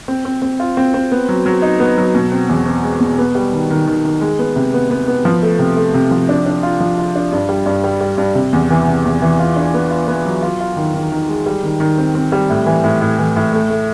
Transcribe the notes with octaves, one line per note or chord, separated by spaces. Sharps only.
C4
C4
C4
F4
C4
C4
B3
F#3
F#3
D#4
B3
F#3
B2
C4
E2
C4
G#3
B2
B3
G3
D#3
D#3
D#3
D#3
G#3
B3
C3
B3
B3
B3
F3
A3
C3
A3
C3
F3
D4
D4
F4
F3
F4
D4
G2
G3
G2
G3
G3
G2
C3
E2
E3
C3
E2
E3
F4
D4
B3
F4
B3
F#3
F4
F4
D#3
D#3
D#3
G#3
G3
D#3
D#3
C4
C4
G3
A2
E3
A2
A2
E3
A2
A3
A3